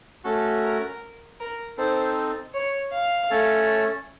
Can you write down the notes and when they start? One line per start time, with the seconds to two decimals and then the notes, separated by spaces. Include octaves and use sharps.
0.24 A3 C#4 F#4 A4
0.63 A#4
1.39 A#4
1.77 C4 D#4 A4 C5
2.54 C#5
2.92 F5
3.30 A3 C#4 A4 C#5